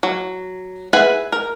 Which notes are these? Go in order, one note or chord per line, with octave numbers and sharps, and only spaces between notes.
F#3
G#4 B4 E5 F#5 G#5
A#4